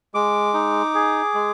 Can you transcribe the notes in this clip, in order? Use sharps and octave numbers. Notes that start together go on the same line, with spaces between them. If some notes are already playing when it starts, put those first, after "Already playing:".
G#3 D6
D#4
G#4
G#3